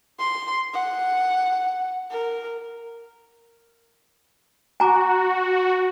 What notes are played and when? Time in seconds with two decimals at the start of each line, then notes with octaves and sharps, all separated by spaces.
0.19 C6
0.73 F#5
2.11 A#4
4.80 F#4 G#5 A#5 D6